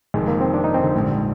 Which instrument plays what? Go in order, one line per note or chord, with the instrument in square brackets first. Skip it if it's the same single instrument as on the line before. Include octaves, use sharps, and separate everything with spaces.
[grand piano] F1 F2 D#3 [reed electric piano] G#3
[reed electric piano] A#3
C4
D4
D#4
C4
D3
[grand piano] A#1 G#2 G3